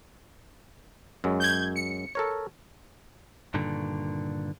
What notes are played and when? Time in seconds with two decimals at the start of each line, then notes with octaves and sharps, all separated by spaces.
1.24 F#2 F#3 G#3
1.40 G6 G#6
1.76 C#7
2.15 A4 A#4 C#5
3.54 G2 A#2 D3 D#3